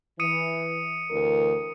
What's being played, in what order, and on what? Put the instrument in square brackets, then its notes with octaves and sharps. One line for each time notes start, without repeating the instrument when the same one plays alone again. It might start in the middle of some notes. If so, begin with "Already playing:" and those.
[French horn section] E3 [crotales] D#6 C#7 D#7
[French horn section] D2 E3 A#4